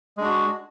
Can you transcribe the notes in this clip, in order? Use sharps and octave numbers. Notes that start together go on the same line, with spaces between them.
G#3 D4 F#4